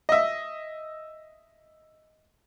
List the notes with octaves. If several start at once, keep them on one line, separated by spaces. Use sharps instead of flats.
D#5 E5